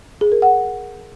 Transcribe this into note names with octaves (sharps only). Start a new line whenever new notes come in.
G#4
A#4
F#5